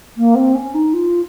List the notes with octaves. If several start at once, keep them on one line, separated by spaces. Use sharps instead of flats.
A#3
C4
C#4
D#4
F4